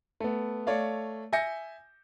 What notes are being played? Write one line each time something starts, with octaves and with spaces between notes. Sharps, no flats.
A3 B3
A3 C#5 D5 F5
E5 G#5 G6 A#6 C#7